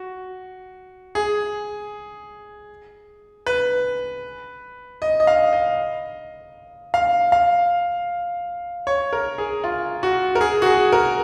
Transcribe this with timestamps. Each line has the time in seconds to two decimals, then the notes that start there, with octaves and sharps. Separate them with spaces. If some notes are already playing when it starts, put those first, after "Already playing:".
Already playing: F#4
1.15 G#4
3.46 B4
5.02 D#5
5.20 D#5
5.27 F5
5.53 D#5
6.94 F5
7.32 F5
8.87 C#5
9.13 A#4
9.38 G#4
9.64 F4
10.03 F#4
10.35 A#4
10.41 G#4
10.62 F#4
10.66 G#4
10.92 A#4